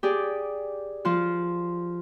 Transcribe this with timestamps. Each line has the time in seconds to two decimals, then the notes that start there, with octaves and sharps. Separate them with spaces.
0.03 G4 G#4 D5
1.05 F3 F4